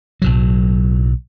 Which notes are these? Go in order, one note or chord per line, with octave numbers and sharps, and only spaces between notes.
B1 A2 F#3